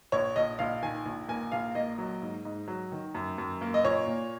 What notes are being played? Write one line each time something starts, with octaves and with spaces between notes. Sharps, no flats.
A#1 C#5
A#1 D#5
A#1 F5
D#3 G#5
A#1
A#3 G#5
A#1 F5
A#3 D#5
F#3
G#2
G#2
F#3
D#3
F#2
F#2
A#3
D#5
A#2 C#5
A#2